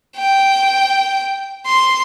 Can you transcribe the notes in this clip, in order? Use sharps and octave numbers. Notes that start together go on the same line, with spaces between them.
G5
C6